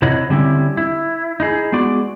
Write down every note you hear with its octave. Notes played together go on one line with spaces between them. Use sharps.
C3 E4 C#5 D#5 F#5
D3 G3 C4 C#4 E4
E4
D#4 E4 G#4
G#3 B3 F#4 D5